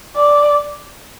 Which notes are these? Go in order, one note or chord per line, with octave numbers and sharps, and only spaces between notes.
D5